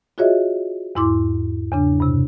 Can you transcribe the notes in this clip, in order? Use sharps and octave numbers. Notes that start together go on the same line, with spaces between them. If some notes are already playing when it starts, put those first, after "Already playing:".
F4 F#4 G#4 C#5 D#5 E5
E2 G#2 E4 C6 D6
E2 C#3 D4
G2 C3